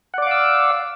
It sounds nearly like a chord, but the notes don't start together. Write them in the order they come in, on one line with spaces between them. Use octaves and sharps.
F#5 D5 D6 F5 E6